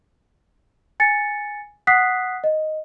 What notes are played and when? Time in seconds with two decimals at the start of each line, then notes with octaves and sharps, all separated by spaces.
1.00 G#5 A6 C#7
1.87 F#5 D#6 F#6 B6 C7
2.44 D#5